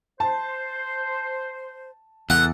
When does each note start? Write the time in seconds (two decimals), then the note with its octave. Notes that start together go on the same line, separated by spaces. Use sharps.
0.20 C5 A5
2.30 E2 E3 A4 F#5